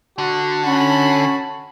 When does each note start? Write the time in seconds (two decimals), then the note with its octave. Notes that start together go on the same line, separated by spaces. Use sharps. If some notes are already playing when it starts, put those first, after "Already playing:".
0.18 D3 F#4
0.65 C#4 F#4 A5 B5